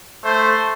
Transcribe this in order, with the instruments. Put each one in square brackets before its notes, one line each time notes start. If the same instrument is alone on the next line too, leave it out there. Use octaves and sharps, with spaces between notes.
[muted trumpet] A3 [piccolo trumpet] C5